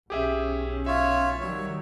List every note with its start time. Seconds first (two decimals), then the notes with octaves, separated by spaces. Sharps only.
0.10 B1 C#4 G4 G#4 E5
0.86 F4 C#5 E5
1.40 D#3 F#3 G3 C#5